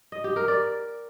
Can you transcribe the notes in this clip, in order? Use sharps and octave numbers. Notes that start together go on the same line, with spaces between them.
D#5
G4
A#4
D5